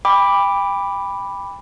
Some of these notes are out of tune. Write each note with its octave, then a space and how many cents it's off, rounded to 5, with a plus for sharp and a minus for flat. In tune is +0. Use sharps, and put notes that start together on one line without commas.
G5 +35 B5 +0 D6 +0